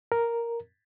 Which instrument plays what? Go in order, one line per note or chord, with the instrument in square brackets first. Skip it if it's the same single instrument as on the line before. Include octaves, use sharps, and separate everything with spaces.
[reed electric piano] A#4